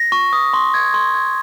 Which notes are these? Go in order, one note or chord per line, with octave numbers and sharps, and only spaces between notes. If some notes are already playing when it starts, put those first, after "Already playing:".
Already playing: A#6
C#6
D#6
C6
G#6
C6
G#6